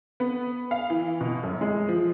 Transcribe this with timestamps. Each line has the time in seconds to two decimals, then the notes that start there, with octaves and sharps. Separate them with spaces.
0.20 B3
0.71 F5
0.90 E3
1.21 B2
1.43 F#2
1.61 G#3
1.89 F3